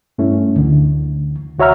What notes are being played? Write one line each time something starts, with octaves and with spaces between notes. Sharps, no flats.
G2 A3 C#4 E4
D2 D3
D2 F#4 C#5 E5 A#5 F6